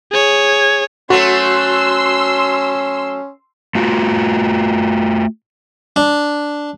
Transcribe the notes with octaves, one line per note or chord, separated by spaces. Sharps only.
G#4 C#5
F#3 A3 C#4 F#4 C6 E6
A3 F4 F#4
D4